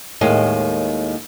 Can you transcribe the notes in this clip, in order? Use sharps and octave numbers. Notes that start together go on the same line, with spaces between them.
D#2 A2 D#3 G#3 D#5